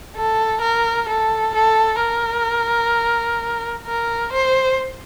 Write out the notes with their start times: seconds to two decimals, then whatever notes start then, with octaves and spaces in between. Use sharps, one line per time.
0.16 A4
0.61 A#4
1.08 A4
1.55 A4
2.00 A#4
3.86 A#4
4.33 C5